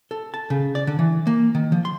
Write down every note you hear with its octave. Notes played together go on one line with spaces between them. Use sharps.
A4
A5
C#3
D5
D3
E3
A#3
D#3
F3
C6